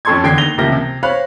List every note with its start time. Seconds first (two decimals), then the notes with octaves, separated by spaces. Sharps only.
0.05 F2 C#4 A4 C6 C#6 G#6
0.23 E2 D3 G5 G#6 C7
0.38 D#2 A#6 F7 G7
0.58 C#2 F3 A#3 E4 G4 A#6
0.72 C3
1.03 C5 C#5 F5 B5 F#6